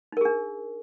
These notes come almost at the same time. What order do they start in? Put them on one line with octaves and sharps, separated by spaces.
D#4 A#4 G#4 D4